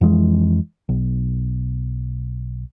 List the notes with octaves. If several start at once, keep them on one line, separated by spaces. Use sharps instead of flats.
F2 E3 G#3
B1